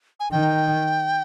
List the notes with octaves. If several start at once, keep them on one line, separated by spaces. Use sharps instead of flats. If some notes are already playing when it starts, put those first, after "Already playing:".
G#5
D#3 G5